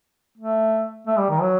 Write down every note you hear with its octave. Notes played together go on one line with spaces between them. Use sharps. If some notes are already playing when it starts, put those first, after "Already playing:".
A3
A3
G3
D#3
F#3